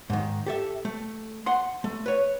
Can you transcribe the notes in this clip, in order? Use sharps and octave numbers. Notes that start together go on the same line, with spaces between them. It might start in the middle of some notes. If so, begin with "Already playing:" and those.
G#2 D#3
G4 A4 E5
A3
F#5 C6
A3
B4 C#5